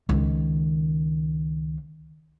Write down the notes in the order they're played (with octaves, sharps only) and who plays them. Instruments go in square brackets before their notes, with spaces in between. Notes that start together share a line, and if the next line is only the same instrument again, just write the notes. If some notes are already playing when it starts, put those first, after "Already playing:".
[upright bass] C#2 D#3